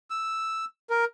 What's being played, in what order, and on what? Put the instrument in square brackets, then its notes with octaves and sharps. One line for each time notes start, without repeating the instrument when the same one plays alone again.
[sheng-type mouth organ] E6
A#4